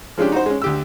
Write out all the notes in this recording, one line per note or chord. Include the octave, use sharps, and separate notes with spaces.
F3 G#3 C#4 D4 G4
D#4 F#4 C5
G#3 C#4
D2 G4 E6